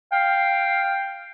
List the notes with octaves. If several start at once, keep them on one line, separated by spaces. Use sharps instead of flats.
F5 G5